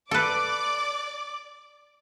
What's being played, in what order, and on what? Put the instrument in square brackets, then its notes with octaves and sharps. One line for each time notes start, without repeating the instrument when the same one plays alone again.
[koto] A4 B4 [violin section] D5 D6